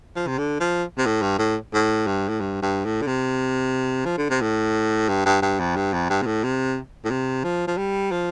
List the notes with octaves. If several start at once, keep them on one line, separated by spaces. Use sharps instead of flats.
F3
C3
D3
F3
C3
A2
G2
A2
A2
G2
A2
G2
G2
A2
D3
C3
F3
D3
C3
A2
G2
G2
G2
F2
G2
F2
G2
C3
A2
C3
A2
C3
F3
F3
G3
F3